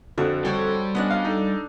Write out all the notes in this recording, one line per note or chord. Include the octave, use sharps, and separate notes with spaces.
F2 D3 F#4
G3 G4 A4 C5 C#5
B3 C#4 D4 D#5 F#5
F5
D#4 A4